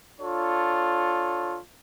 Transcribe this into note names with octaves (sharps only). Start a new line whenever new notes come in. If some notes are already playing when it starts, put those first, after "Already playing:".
D4 F4 A4 C#5